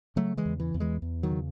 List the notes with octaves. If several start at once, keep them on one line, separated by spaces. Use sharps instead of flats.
C#3 F#3 A3
E3 G#3
E2
E3
E2
E3 G#3
E2
D#3 F#3
C#3